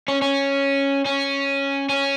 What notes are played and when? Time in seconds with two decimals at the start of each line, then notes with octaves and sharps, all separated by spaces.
0.08 C#4
0.22 C#4
1.05 C#4
1.89 C#4